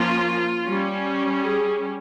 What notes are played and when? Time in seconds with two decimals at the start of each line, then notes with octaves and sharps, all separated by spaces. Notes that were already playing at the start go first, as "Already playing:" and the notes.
Already playing: F3 A#3 C#4 F4
0.66 G3 C#4
1.42 G#4